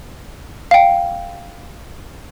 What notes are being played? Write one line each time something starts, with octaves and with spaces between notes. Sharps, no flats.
F5 G5